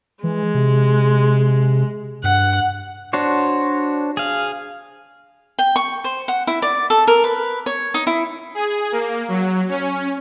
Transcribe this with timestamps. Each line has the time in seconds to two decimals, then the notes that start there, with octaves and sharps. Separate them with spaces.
0.23 E3 G#3
0.54 C3
2.24 G2 F#5
3.13 D4 F#4 C5 C#5
4.17 G#4 F5
5.59 G5
5.76 C#6
6.04 C5
6.28 F#5
6.47 E4
6.62 D5
6.90 A4
7.08 A#4
7.24 B4
7.66 C#5
7.94 D#4
8.07 E4
8.55 G#4
8.92 A#3
9.28 F#3
9.69 C#4